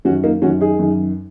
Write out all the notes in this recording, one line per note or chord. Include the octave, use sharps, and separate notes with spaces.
F#2 D#3 C#4 F#4
A#3 D#4
F#2 D#3 C#4 F#4
D#4 G#4
F#2 D#3